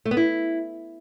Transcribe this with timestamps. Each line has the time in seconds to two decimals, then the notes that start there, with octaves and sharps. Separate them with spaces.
0.05 A3
0.11 B3
0.17 E4